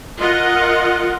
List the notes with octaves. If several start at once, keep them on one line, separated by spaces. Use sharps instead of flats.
F4 A#4 D#5 F#5